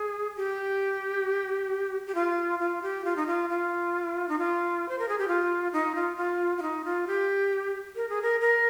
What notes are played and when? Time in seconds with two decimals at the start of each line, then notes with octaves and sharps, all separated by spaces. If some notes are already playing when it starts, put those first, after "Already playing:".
Already playing: G#4
0.37 G4
2.07 G4
2.15 F4
2.59 F4
2.82 G4
3.05 F4
3.16 D#4
3.27 F4
3.50 F4
4.29 D#4
4.39 F4
4.89 C5
4.99 A#4
5.09 G#4
5.19 G4
5.28 F4
5.73 D#4
5.95 F4
6.17 F4
6.58 F4
6.62 D#4
6.85 F4
7.07 G4
7.96 A#4
8.09 G#4
8.22 A#4
8.41 A#4